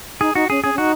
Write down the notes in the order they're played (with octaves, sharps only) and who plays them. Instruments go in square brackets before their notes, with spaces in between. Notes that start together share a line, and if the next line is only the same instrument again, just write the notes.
[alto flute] D#4 [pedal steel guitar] G#4
[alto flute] D#4 [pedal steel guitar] F#4
[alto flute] C#4 [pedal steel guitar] G#4
[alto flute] C#4 [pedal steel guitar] G#4
[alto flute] C#4
[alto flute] D#4 [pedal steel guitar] F#4